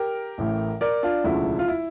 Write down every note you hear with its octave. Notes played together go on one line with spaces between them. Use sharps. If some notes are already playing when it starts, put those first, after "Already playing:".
Already playing: G4 A#4
A1 A2 E3
A#4 D5
D4 F4
E1 D2 C#3 F3 E4
F4
E4